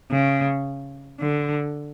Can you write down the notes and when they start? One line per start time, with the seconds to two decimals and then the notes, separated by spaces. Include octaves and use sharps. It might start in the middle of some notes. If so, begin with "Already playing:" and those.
0.11 C#3
1.20 D3